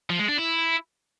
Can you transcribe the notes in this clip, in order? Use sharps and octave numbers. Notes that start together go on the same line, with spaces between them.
F3
G#3
D4
E4